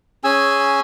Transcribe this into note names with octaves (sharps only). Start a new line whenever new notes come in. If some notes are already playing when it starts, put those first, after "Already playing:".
C#4 G#4 G#5 E6